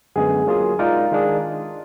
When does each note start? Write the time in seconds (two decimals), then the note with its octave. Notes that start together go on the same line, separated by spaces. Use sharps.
0.16 F#2 D3 G#3 B3 G#4
0.47 F#3 A#3 F4 G#4
0.79 G#3 D#4 F4 A#4 D5
1.11 D#3 G#3 D4 G#4